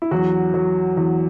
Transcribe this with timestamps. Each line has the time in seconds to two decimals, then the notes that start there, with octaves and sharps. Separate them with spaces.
0.02 E4
0.11 E2 F#3 F#4
0.54 F#3
0.97 E2